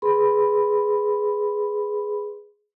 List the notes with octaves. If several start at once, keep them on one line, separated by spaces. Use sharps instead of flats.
G#4 B4 B5 C6